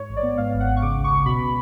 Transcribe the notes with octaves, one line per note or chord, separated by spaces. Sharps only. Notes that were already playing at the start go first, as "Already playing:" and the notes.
Already playing: G#2 C#5
A1
D5
B3
G#2 F5
G#1
F#5
G#1
C#6
C#3 D6
C#2
C#6
C#2
B2 B5